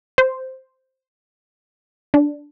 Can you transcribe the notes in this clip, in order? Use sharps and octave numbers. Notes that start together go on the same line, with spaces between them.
C5
D4